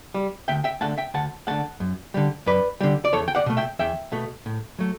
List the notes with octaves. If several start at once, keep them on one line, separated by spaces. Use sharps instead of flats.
G3
D2 E5 G5
E5 G5
D3 A3 F#5 A5
E5 G5
D2 F#5 A5
D3 A3 F#5 A5
F#2
D3 G3
F#2 B4 D5
D3 G3
D5
E2 A4 C#5
G5
D5 F#5
B2 A3
E5 G5
E2 E5 G5
B2 A3
A2
F#3 A3